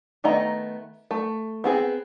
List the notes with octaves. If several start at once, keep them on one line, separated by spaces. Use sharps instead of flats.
D#3 A3 B3 D#5 A#5
A3
B3 C4 G#4